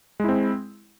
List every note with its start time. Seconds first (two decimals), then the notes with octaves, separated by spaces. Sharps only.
0.20 G#3
0.24 E4
0.29 C4